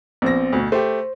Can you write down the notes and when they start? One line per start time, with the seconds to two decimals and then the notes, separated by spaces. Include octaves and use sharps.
0.22 A#1 B3 C4 C5 A#6
0.53 D2 B2
0.72 A3 G4 C5